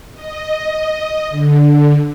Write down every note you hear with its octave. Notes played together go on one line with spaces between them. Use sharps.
D#5
D3